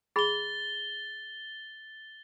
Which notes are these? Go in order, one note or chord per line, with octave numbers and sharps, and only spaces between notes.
G#4 B5 A6 G7